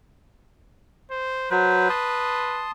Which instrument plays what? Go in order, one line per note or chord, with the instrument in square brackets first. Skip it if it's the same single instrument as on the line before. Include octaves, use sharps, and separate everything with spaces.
[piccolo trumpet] C5
[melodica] F#3 C5 [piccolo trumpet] B4
[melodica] A5 C6 D#6